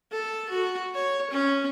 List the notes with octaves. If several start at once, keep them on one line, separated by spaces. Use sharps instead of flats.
A4
F#4
C#5
C#4